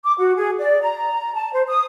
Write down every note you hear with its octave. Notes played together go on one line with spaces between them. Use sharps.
D6
F#4
G#4
D5
A#5
A5
C5
D#6